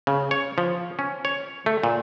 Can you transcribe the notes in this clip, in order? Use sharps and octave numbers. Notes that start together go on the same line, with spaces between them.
C#3
C#5
F3
C#4
C#5
A3
A#2